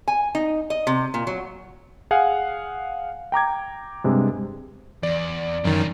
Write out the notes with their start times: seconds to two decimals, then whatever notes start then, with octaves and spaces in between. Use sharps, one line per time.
0.08 G#5
0.35 D#4
0.70 D#5
0.87 C3
1.14 A#2
1.27 F#3
2.11 G#4 F5 F#5 G#5
3.32 G5 A#5 D6 G#6
4.04 G2 C3 G#3
5.03 E2 D5
5.65 F#2 D#3 E3 D4